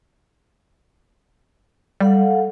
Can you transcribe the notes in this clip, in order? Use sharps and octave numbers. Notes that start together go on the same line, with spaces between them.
G3 A4 F5 F#5